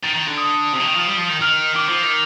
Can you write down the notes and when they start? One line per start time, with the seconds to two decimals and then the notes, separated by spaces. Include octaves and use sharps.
0.03 D#3 A6
0.15 D#3
0.27 D3
0.38 D#6
0.73 C3
0.80 D3
0.83 D#3
0.95 F3
1.07 G3
1.18 F3
1.29 D#3
1.41 D#3 F6
1.75 D#3 D6
1.88 F3
2.02 D#3